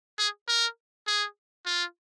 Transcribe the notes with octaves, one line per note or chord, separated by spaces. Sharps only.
G#4
A#4
G#4
F4